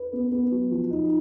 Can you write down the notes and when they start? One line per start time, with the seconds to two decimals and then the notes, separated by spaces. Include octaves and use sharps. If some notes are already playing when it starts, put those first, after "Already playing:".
Already playing: B4
0.13 B3
0.32 B3
0.52 F#3
0.71 F3
0.90 D#4